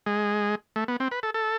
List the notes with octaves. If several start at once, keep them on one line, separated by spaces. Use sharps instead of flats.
G#3
A3
B3
C4
B4
A4
A4